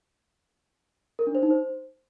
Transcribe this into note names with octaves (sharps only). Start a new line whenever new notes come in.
A#4
D4
C5
D#4
C5